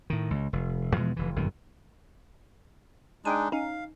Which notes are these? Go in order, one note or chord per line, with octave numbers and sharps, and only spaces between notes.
A2 D#3
C#2
F1
E2 B2 F3 G#3
F1 E3
G1 F#2 A#2 D#3
G#3 D4 D#4 G5 G#5
C#4 D#4 F5